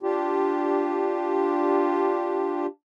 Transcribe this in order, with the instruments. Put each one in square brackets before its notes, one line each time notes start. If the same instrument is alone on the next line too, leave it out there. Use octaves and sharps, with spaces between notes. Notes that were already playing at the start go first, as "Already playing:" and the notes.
[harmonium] D4 F4 G4